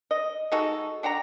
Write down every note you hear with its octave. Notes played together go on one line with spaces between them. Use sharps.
D#5
G#3 D#4 F#4 A4
D4 F#5 G5 A#5